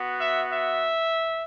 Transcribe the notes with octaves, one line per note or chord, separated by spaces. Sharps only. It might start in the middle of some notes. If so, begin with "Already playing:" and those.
Already playing: B3 F#4
E5
E5